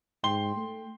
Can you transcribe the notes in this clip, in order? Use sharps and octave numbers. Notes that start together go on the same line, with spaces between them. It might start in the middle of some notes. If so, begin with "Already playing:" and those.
G#2 G5 C6 G7
A3